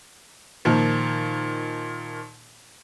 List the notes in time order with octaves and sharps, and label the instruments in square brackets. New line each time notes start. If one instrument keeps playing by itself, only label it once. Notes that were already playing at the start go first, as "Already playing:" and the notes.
[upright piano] A#2 D#3 F3